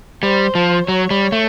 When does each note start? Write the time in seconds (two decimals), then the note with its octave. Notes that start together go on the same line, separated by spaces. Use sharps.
0.23 G3 C5
0.55 F3
0.88 F#3 C#5
1.11 G3
1.32 A3